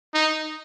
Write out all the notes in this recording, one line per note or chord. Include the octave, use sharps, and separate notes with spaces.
D#4